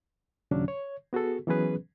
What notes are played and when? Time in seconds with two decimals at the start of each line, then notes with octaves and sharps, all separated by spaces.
0.51 D#2 A#2 C#3 F#3 C#4 D4
0.68 C#5
1.13 B3 F#4 G#4 A4
1.47 E3 F#3 B3 C#4 G#4 B4